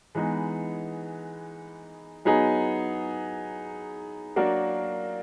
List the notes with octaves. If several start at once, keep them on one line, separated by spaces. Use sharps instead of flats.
E3 G#3 B3 D#4
F#3 B3 D#4 G#4
F#3 A#3 D4 F#4 A#4